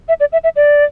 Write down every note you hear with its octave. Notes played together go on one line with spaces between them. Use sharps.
E5
D5
E5
E5
D5